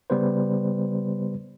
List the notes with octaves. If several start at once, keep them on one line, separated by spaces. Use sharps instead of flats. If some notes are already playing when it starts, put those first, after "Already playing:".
C#3 G3 B3 B4 C5